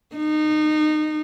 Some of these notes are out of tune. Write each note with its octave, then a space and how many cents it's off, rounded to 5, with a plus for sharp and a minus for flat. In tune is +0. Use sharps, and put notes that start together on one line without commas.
D#4 -25